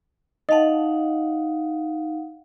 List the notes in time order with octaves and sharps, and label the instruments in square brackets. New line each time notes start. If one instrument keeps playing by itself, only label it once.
[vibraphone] D#4 F5 F#5 [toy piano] D#5 A5